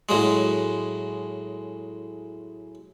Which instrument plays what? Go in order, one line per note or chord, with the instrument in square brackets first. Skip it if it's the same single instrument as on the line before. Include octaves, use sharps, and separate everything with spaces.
[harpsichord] A2 F#3 G#3